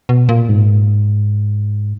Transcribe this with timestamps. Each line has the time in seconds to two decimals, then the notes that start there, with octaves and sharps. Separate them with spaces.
0.09 B2
0.29 A#2
0.49 G#2